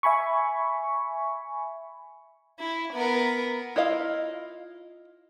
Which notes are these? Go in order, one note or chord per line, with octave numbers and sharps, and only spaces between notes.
E5 G#5 B5 C#6
E4
B3 A#4
E4 F4 D#5 F5